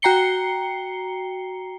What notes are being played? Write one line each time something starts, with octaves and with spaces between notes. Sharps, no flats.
F#4 G5 A#5 C7 C#7 G7